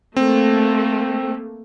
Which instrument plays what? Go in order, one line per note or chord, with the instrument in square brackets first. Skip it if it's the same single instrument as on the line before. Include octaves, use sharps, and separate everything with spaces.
[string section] A3 A#3 [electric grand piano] C4